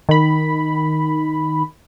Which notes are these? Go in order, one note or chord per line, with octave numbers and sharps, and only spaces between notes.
D#3 B5